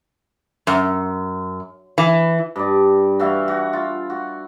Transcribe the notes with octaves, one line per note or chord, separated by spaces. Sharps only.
F#2
E3
G2 D5
E3 F#4 E5 F5
F#4
F4
F#4